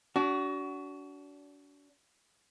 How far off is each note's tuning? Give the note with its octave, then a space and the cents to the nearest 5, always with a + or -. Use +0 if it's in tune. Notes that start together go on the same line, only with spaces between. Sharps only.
D4 -35 F#4 +25